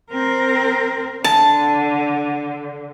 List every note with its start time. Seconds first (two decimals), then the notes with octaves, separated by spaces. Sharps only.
0.11 C4 A#4
1.24 D3 A5